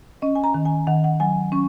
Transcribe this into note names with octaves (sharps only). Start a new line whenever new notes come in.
C#4 D#5
G#5
A#5
D#3
G#5
D#3 F#5
F#5
F#3 G#5
C#4 C#6